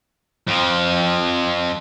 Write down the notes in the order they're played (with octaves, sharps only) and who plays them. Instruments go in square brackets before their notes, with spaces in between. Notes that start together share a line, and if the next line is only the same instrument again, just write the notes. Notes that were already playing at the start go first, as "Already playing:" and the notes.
[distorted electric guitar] F2 F3